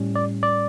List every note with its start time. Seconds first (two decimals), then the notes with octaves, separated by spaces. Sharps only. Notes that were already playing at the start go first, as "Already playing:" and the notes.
Already playing: A2 G3 C#4
0.16 D5
0.43 D5